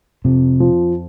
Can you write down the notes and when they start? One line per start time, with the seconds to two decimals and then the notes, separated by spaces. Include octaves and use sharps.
0.24 F2 C3
0.60 F3